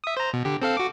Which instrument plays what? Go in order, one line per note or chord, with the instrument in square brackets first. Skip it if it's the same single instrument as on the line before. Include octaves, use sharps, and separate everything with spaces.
[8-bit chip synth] E5 D#6
C5 A#5
B2
D3 G4
C4 A4 F5
F#4 D6